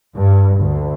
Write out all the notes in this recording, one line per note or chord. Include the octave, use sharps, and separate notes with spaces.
G2
D2